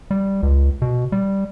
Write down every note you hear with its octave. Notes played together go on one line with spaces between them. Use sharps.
G3
C#2
B2
G3